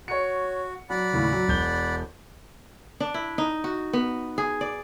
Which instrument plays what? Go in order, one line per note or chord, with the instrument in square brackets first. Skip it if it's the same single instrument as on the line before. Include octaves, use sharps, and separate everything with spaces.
[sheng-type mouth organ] F#4 [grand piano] C#5 C#7
[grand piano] F#3 [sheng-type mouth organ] D5 F#5 B5
[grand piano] D#2 A2 C#3
F#3
E1 G6 G7
[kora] D4
E4
D#4
F#4
B3
G#4
D5